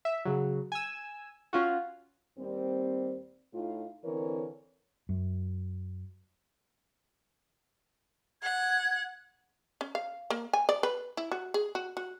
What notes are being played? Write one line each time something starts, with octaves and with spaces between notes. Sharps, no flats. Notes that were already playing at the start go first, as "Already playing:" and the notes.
E5
C#3 F#3
G#5 E6
C#4 F4 F#4
D#2 G3 C4
A2 D#4 F4
D3 E3 C4 A#4 C#5
F#2
F#5 G#6
C#4
F5
A#3
G#5
D5
B4
E4
F#4
G#4
F#4
F#4